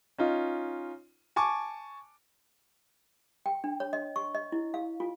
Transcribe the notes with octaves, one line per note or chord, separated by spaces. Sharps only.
C#4 D#4 F4
G#5 A5 C#6 D6
G5
D4
C#5
D#5
C#6
D#5
E4
F5
F4